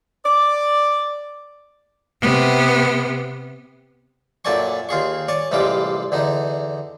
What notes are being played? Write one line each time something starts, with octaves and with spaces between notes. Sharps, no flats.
D5
C3 B3
F#2 A#2 A4 D5 G#5 C#6
D#2 F4 G#4 C#6
C#5 D5 G#5 C#6
A1 C3 G3 G#3 F4 D6
E2 D3 D#4